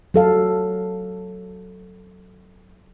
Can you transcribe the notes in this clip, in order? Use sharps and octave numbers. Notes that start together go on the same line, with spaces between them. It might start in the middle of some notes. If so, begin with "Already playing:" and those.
F#3 A4 F5